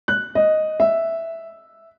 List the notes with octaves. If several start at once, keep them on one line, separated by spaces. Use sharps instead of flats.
F#6
D#5
E5